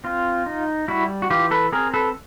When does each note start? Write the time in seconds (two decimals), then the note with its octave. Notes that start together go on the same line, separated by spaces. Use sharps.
0.04 C4 F4
0.46 D#4
0.88 G3 E4 F#4
1.22 F#4
1.30 E3 F4 G4
1.51 A4 B4
1.72 C4 G#4 A#4
1.94 A4 B4